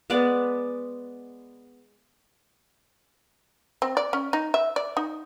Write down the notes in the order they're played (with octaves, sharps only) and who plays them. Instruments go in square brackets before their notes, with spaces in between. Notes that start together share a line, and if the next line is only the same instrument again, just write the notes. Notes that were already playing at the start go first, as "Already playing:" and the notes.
[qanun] G#3 B3 D5
[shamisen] C4
D5
C#4
D#4
E5
D5
D#4